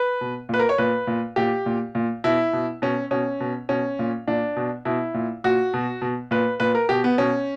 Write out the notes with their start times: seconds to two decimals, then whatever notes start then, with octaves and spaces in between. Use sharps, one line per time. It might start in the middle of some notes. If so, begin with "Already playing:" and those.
Already playing: B4
0.21 B2
0.49 A#2 B4
0.59 A#4
0.69 C#5
0.78 A#2 B4
1.07 A#2
1.36 A#2 G4
1.66 A#2
1.95 A#2
2.24 B2 E4
2.53 B2
2.82 B2 C#4
3.11 B2 C#4
3.40 B2
3.69 B2 C#4
3.99 A#2
4.28 A#2 D4
4.56 B2
4.85 B2 E4
5.14 A#2
5.44 A#2 F#4
5.74 B2
6.02 B2
6.31 A#2 B4
6.60 A#2 B4
6.75 A#4
6.89 B2 G4
7.04 B3
7.18 B2 C#4